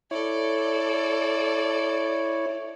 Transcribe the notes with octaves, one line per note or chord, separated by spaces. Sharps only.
E4 A4 C#5 D5